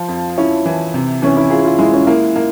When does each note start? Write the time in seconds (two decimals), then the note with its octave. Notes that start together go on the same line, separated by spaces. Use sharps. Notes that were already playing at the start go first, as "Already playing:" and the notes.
Already playing: F3 F4
0.08 F2
0.38 C#4 E4
0.65 E3
0.94 C3
1.22 E3 C#4
1.37 E4
1.51 F4 G#4
1.65 F4
1.79 G#3 E4
1.93 C#4
2.07 A#3 E4
2.36 A#3